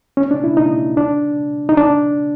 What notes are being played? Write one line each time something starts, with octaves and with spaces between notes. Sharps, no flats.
C#4
D4
E4
D#4
D4
D#4
D4